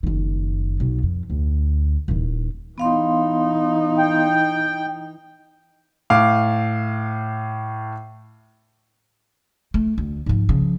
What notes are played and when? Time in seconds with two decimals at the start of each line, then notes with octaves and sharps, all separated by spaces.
0.03 F#1 D#3
0.80 B1 B3
1.03 F2
1.30 D2
2.08 D#1 E3
2.78 E3 B3 D#4 F5 C6
3.98 G5
6.10 A2 F5 D6
9.74 A3
9.98 D2
10.26 G#2 F3
10.49 C#3 F3